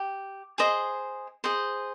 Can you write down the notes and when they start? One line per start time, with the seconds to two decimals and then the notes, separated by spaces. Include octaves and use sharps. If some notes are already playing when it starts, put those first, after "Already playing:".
Already playing: G4
0.58 G#4 C5 D#5
1.44 G#4 C5 D#5